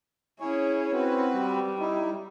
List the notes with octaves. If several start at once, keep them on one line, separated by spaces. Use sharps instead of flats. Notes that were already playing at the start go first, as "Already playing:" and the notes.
C#4 E4 G#4 C#5
C4 F#4 B4
G3
D#4 E4